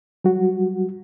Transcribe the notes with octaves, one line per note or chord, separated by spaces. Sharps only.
F#3 G3 F#4